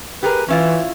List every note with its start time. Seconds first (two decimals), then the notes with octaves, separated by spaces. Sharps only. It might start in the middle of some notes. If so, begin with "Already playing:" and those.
0.23 G4 G#4 A#4 B4
0.48 E3 C#4 E4 F4